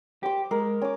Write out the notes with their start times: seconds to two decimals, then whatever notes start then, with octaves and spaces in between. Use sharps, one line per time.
0.23 G4 C5 D6
0.51 G#3 A#4
0.81 C#4 D6